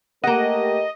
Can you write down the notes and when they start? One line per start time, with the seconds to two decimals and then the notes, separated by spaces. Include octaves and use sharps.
0.24 A3 A#3 G4 A#4 D#5 F#5